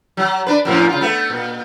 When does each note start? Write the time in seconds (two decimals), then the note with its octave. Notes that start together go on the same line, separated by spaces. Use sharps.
0.17 F#3
0.47 D4 B4
0.65 F#2 A2 F3
0.89 C#3 F4
1.01 A3 B3
1.30 A#2